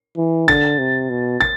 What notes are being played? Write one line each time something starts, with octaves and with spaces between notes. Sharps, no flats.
E3
D3 A6
C3
B2
A6